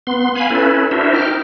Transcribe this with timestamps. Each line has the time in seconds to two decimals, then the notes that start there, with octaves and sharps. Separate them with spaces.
0.07 B3 C6
0.35 F5 G#5 B5
0.50 C#4 E4 A4 B4
0.91 D4 E4 F#4 A#4 C5 E5
1.14 D#4 G5 F6